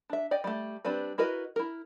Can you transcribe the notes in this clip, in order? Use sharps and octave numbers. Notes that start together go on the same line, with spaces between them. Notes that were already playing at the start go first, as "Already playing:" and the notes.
D4 E5
D5 D#5 G5
G3 A3
G3 C4 D4 B4
E4 F#4 A#4 B4 D#5
E4 A#4